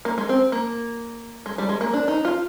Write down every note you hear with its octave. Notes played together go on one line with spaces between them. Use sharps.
A#3
G#3
C4
A#3
G#3
G3
G#3
A#3
D4
D#4
F4